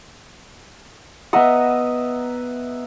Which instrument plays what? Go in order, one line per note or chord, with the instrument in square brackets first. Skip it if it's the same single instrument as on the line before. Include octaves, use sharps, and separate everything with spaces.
[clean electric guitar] B3 F#5 [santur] D#5 E5 A#5